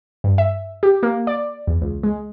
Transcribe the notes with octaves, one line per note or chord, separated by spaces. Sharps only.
G2
E5
G4
A#3
D5
E2
C#2
G#3